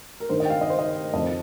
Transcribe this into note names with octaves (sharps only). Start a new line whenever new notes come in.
A#4
G2 D#3 C5
D#5
G5
F5
D#5
C5
D#5
F2 F3 D#5